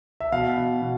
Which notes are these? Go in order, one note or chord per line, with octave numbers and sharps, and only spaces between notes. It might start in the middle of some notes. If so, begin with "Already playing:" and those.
E5
B2 F5
B2
B2